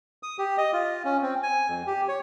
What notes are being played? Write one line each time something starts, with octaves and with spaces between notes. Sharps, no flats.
D#6
G4
D#5
F4
C#4
C4
G#5
F2
G4
C#5